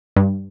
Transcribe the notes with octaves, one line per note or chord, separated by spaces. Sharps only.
G2